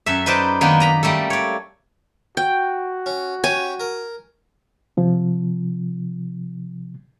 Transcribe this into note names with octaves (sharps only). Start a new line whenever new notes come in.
F#2 A4 E5
D#4 B4 C5 D5 A5
D#3 A#3 B3 D4
D#5 A#5 B5
G3 A3 A#3 A4
C#5 D5
F#4 G5
C#4
C#4 G4 C#5 G#5
A#4
C3 F3